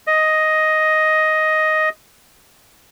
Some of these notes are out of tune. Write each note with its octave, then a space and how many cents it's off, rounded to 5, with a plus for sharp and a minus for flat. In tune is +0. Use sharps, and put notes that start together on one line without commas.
D#5 +5